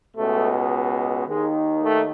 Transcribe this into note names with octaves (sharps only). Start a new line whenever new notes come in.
C#2 B2 A3
D#2 D#3 G#3
A3